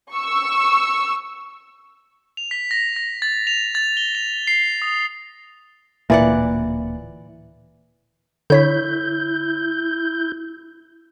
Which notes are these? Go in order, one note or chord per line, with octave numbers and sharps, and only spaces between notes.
C#6 E6
F7
B6
A#6
A#6
A6
F7
A6
G7
F7
C7
D#6
D1 A#2 E3 A#3 D5 F#5
D3 E4 C#5 G6 B6